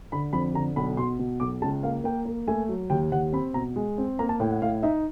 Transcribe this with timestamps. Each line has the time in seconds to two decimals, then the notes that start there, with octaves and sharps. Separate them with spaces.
0.12 D3 B5
0.33 F2 B5
0.54 D3 A#5
0.76 B1 B5
0.97 B2 C6
1.19 B2
1.40 B1 D6
1.62 C#2 A5
1.83 A#3 F5
2.04 A#3 G5
2.25 A#3
2.47 A3 G#5
2.69 F#3
2.90 D#2 G5
3.12 D#2 F#5
3.33 C4 B5
3.54 B2 A#5
3.76 G#3
3.98 C4
4.19 A#3 A#5
4.29 A5
4.40 A2 G5
4.51 F#5
4.62 A2 F5
4.82 D#4 E5